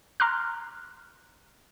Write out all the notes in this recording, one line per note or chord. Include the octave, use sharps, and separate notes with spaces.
A#5 C6 D6 F6 F#6